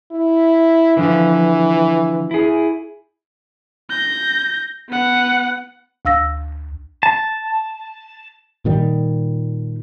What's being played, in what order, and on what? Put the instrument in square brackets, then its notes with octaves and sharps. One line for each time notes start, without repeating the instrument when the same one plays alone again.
[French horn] E4
[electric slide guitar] D3 F3 [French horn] E3
[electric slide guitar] E4 G#4
[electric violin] G6 A#6
B3 F#5
[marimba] D2 F5 E6 A#6
[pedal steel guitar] A5
[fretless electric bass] A#2 D#3 G3